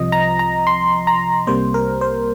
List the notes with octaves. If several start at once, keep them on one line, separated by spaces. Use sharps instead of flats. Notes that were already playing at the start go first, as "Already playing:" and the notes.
Already playing: C2 C3 F3 D#5
A#5
A#5
C6
A#5
C2 C3 G3 A#3 C5
A#4
C5